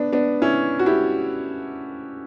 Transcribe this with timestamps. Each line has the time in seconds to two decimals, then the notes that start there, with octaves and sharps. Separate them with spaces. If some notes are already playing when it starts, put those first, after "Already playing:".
Already playing: B3 D4
0.13 B3 D4
0.42 C#4 E4
0.79 F#4
0.86 E4 G4